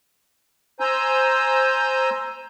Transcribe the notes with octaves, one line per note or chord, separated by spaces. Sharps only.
C5 G#5 A#5 E6 G6